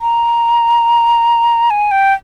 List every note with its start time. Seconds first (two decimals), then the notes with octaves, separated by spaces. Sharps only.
0.01 A#5
1.70 G#5
1.91 G5